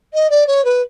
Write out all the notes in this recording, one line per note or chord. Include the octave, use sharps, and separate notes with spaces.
D#5
D5
C#5
B4